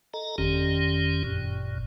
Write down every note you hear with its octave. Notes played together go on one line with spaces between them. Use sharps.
A4 D#5 A#5
G1 F2 D#3 C#4 G4
G1 F#2 A#2